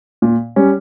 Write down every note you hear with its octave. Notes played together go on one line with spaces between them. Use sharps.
A#2
G3 C#4